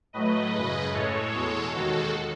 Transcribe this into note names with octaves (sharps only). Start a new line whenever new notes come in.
A2 F#3 A3 B4 D#5
F#2 C#3 G#3
A2 G#3 A4 C#5
E2 B2 G#3
D#2 D#3 G#3 F#4 A4